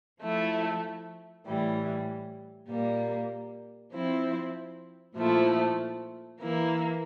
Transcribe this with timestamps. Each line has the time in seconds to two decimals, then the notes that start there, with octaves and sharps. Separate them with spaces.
0.22 F3 A3 E4
1.45 A2 E3 G3
2.69 A#2 G3 A#3
3.92 F3 C4 E4
5.14 A#2 F3 A3 E4
6.38 E3 A#3 E4